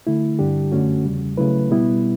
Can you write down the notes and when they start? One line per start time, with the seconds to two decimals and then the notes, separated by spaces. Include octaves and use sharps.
0.07 D3 A3 E4
0.39 G2 D3 G3 D4 G4
0.72 F#2 D3 A3 C#4 F#4
1.05 E2 C#3 G3
1.37 C#3 F#3 A3 E4 B4
1.70 B2 G3 B3 E4